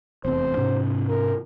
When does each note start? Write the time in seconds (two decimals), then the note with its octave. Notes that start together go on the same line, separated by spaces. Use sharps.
0.25 F1 E2 C4 C5
0.57 G#2 C3 C#4
1.08 A#4